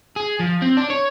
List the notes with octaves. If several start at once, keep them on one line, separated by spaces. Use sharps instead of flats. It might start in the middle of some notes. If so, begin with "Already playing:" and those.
G#4
F3
C4
D4
C#5